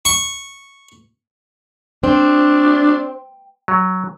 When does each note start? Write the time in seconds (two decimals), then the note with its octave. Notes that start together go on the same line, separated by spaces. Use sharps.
0.05 C#6
2.04 C4 D4
3.68 F#3